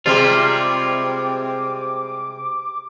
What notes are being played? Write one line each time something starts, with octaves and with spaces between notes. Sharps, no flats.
C3 G3 G#3 C4 F4 D6